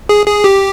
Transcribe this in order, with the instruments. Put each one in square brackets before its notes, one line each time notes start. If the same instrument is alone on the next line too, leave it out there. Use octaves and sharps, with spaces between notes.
[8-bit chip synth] G#4
G#4
G4